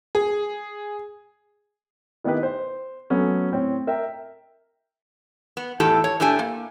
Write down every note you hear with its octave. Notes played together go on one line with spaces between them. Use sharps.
G#4
D#3 B3 D#4 E4 G4 B4
C5
F#3 A3 B3 C#4
A2 C4 C#5
A#4 E5 G5
B3
E2 A2 G4 A4
C#5
A2 A3 D4 G4 G#5
A#3